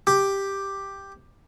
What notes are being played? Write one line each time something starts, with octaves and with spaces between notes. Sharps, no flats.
G4